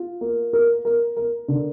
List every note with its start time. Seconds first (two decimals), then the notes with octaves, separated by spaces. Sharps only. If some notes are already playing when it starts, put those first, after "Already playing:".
Already playing: F4
0.21 A#3
0.53 A#4
0.85 A#4
1.17 A#4
1.48 D3